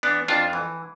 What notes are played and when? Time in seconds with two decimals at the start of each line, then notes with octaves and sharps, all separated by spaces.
0.03 E3 B3 D4
0.28 F2 D4 F4
0.53 E3